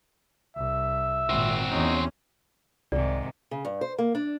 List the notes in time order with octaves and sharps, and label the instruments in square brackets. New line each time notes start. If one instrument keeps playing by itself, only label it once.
[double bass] C2 [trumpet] E5
[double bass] G#1 A#2 [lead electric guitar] C4 F#4
[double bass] E2 C#4 [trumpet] D#4
[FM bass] C2 [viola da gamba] G#2 C3 D#3 [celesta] D5
[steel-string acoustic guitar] C#3
G2
C5
A#3
D4